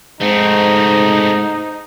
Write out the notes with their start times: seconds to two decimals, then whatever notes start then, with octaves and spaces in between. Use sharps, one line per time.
0.21 G#2 A3 C4 D#4